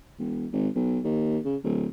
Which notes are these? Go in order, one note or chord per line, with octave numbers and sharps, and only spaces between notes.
E1
G#1
B1
D#2
C#3
D1